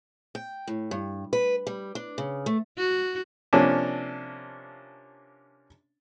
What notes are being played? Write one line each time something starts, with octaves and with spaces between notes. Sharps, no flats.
G5
A2
G2
B4
G3
D4
C#3
A3
F#4
C3 F3 A#3 C#4 D4